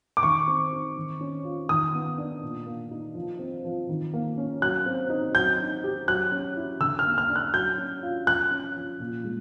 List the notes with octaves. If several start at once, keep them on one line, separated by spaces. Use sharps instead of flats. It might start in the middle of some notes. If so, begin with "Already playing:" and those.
D6
D#3 C#6
C4
D#4
D#3
C#4
F4
D#3 D#6
B3
D4
A#2
A#3
D#4
F3
C4
F3
D#3
A#3
C#4
F#3 F#6
C4
D#4
F#3 G6
D#4
G4
F#3 F#6
C#4
E4
D3 E6
F6
A#3
F6
D4
F#6
F#3 G6
C#4
F4
F3 F#6
C#4
F3
A#2
G#3